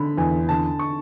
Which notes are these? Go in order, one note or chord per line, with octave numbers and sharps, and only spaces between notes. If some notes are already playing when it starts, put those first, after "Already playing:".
Already playing: D3 B5
E2 G#5
D3 A5
C#6